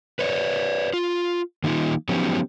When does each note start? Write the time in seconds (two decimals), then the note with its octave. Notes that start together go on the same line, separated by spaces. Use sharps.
0.19 B4 C#5 D5
0.93 F4
1.64 D#3 A#3 C#4 D#4 F4
2.09 F3 F#3 B3 C#4 D#4 G4